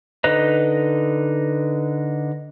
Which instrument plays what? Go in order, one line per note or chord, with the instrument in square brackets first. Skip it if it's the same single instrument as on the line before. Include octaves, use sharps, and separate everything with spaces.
[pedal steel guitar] D3 D#4 B4 D#5 A#5